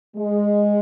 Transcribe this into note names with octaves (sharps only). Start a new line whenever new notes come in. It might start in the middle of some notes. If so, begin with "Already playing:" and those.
G#3